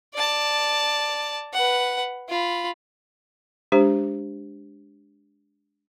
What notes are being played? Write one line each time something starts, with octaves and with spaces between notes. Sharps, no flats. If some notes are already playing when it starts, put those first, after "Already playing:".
D5 A5
B4 F#5
F4 B5
G#3 D4 G4 C5